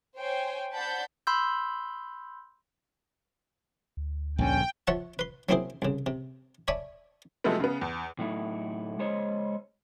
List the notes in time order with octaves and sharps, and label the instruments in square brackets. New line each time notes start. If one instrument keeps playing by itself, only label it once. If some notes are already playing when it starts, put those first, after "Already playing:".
[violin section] C5 C#5 G5 G#5
C5 D5 F#5 A5 B5 G6
[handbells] B5 C6 E6 G6
[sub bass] D2
[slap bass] A#1 G2 D3 [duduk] C#4 [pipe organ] G5
[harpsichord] F3 C#5 E5 F#5 A5 C#6
B4 C6
F#3 A#3 C4 E4 G#4 C5
C2 C#3
C3
C#5 D5 E5 G#5 A5 B5
[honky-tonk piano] C3 F3 F#3 G#3 A3 B3
C#3 B3
E2
[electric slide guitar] A2 F#3 A3 D#4 E4
G#3 C5 C#5 D#5